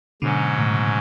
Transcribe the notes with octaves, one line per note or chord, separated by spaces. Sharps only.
G#2 B2 D3 F#3 C#4
A2 C#3